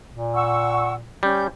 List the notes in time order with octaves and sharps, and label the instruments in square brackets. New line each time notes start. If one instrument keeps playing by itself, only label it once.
[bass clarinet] A#2
[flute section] F#5 C#6 E6
[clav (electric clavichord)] G3 [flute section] C#4 G6